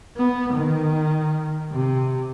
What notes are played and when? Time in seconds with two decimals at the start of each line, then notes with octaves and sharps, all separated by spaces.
0.17 B3
0.53 D#3
1.72 C3